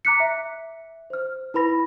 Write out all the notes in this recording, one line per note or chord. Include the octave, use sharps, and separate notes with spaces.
A#5 D6 F#6 B6 C#7
E5
C5 F6
E4 B4 B5 A#6